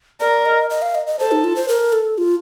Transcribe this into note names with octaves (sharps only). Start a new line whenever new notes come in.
A#4 D5
D#5
D#5
F5
D#5
D#5
A4 C5
D#4
F4
C5
A#4
A4
F4